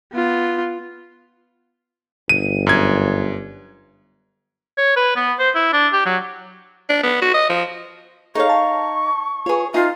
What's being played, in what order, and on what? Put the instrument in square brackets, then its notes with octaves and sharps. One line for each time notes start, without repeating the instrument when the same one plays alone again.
[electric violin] B3 F4
[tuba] G1 [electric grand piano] D#7
[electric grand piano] F#2 G#6
[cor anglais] C#5
B4
B3
C5
E4
D4
G4
F#3
[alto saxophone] D4
B3
F#4
D#5
F3
[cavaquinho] D#4 F5 [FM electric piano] G#4 A4 C#5 [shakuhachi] C#6
[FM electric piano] A5
[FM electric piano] F4 B4 [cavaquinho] G#4 C#5
[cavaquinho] D#4 [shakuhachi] F4 [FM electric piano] E5 G#5 C7